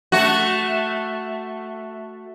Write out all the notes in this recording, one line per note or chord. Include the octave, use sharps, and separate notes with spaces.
A3 F#4